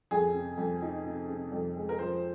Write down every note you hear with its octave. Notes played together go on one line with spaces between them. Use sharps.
F2 G#4
C3
F2
D#4
C3
C3
F2
G#3
A#4
F3 C5